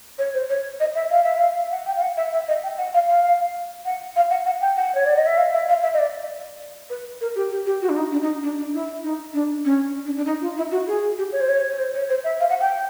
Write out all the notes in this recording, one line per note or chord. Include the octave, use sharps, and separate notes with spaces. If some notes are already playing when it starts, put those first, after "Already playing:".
C#5
C5
C#5
D#5
E5
F5
E5
F5
F#5
G5
F5
F#5
E5
E5
D#5
G5
F#5
F5
F5
F#5
F5
F#5
F#5
G5
F#5
C#5
D5
D#5
E5
F5
E5
F5
E5
D#5
D5
B4
A#4
G4
G4
G4
F#4
D4
D#4
D4
D#4
D4
D4
E4
D#4
D4
C#4
D4
D4
D#4
F4
E4
F#4
G#4
G4
C#5
C5
C#5
C#5
C5
C#5
C5
E5
F5
F#5
G5